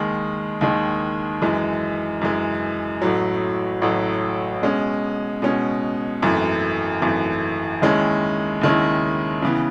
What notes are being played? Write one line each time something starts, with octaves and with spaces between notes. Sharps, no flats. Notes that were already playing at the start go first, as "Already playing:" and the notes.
Already playing: D#2 D#3 G#3
D#2 D#3 G#3
F#2 E3 G#3
F#2 E3 G#3
A1 A2 F#3
A1 A2 F#3
B2 G#3 C#4
B2 G#3 C#4
G#1 F#2 E3 A3
G#1 F#2 E3 A3
D#2 D#3 G#3 C#4 E4
D#2 D#3 G#3 C#4 E4
C#3 E3 B3